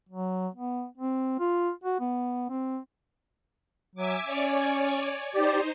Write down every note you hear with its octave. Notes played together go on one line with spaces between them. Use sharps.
F#3
B3
C4
F4
F#4
B3
C4
F#3 E5 G#5 D6
C#4 C#5 D5 G#5
D#4 G4 C5 D5